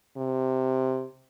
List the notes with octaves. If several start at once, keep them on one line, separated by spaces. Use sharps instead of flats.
C3